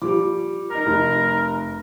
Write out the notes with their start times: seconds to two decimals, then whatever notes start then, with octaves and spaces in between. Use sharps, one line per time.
0.02 F3 G3 D6
0.70 D#4 A#4 F6
0.86 F1